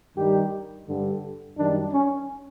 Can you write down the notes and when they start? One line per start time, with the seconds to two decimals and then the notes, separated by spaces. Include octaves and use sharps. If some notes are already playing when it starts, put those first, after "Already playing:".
0.16 G2 D#3 G3 G4
0.87 G2 D3 G3
1.57 F#2 D#3 G3 D4
1.92 C#4